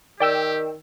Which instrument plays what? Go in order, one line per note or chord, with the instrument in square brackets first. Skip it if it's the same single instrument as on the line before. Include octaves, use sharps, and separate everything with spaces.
[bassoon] D#3 [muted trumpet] G4 [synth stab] D5 G5 E6